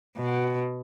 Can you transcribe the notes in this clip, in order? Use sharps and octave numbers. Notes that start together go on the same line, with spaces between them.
B2